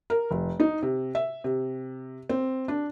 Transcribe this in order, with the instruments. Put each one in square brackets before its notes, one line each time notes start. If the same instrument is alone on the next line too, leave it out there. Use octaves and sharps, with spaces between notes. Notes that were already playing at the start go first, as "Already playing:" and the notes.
[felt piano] A#4
F1
D#4
C3
E5
C3
C4
D4